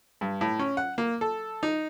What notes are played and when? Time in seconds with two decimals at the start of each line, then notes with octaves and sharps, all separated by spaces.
0.21 G2
0.41 A2
0.59 C#4
0.77 F#5
0.98 A#3
1.21 A4
1.63 D#4